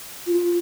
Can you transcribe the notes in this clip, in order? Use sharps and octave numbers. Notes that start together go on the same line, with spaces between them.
F4